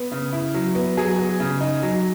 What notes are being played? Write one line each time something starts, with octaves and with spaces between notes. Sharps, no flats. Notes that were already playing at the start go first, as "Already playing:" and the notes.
Already playing: B3
C#3
E4
F#3
B3
F#3 G#4
B3
C#3
D#4
F#3